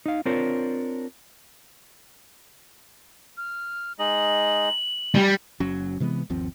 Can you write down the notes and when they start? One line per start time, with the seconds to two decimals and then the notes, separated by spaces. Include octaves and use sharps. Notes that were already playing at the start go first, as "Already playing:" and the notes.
0.06 D#4 F5
0.25 C4 D4 F4 A#4 C5 C#5
3.37 F6
3.99 G#3 D#4 D#5 F#7
5.15 G3 G5 G#5
5.60 F#1 F#3 C#4
6.00 C3 E3 G#3 B3
6.30 G1 D#2 F3 C4